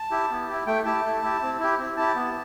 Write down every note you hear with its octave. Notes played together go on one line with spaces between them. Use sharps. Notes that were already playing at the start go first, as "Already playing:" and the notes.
Already playing: A5
E4 G4
B3
E4 G4
A3 G5
E4 G4 A5
A3
E4 G4
C4
E4 G4
C4
E4 G4 A5
B3